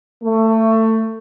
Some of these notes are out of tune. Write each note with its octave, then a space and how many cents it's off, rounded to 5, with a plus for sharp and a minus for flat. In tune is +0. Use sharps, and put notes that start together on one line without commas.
A3 +20